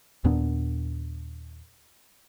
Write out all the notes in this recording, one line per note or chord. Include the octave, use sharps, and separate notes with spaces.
D#2 A#2 B3 D4